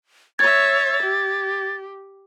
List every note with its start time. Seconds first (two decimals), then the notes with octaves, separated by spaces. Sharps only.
0.39 C#5 E5 G#6 A6
1.03 G4